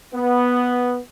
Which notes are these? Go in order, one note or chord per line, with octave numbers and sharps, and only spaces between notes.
B3